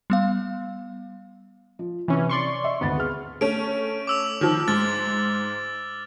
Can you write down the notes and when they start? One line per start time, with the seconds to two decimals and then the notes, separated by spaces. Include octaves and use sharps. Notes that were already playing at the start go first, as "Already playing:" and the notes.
0.10 G3 B3 F5
1.79 F3
2.08 C3 E3 C#4
2.29 D5 C6 C#6
2.64 E5
2.81 G#1 D2 B3 A6
2.97 G#4 F6
3.41 A3 C#4 D7
4.07 D6 E6 F7
4.41 D#3 F3
4.68 G#2 F6 A6